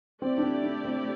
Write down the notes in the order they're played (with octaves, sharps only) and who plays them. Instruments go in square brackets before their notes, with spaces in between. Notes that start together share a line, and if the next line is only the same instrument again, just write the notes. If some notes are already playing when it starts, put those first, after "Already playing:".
[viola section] A3 E4 G4 D5 [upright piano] C4
[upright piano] D4
C4
D4
C4